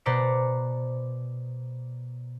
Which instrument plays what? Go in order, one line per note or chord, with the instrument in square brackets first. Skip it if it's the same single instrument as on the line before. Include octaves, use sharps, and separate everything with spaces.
[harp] B2 B4 C5 D5 A#5 C#7